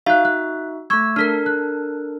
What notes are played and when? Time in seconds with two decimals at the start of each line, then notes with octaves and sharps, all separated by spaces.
0.06 D#4 F#4 E5 F5 F#6
0.25 F#6
0.90 A3 C#6 E6 G#6
1.16 D4 A4 A#4 F6 B6
1.46 F#6